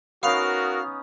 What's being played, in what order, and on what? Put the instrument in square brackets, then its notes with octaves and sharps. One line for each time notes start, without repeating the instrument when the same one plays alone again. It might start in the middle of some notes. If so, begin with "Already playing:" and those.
[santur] B3 C#4 D#4 [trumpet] F#4 [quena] A#4 [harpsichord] F5